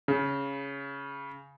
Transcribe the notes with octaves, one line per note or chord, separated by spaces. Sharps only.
C#3